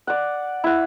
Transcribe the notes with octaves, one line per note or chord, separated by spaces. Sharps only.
D5 F#5
E4 F#5